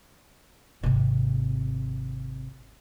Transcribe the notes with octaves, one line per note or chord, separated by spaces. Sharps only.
G#1 C3